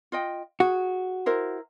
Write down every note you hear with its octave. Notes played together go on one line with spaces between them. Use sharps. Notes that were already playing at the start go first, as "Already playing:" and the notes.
F4 D#5 G5
F#4 G#4
E4 A#4 C5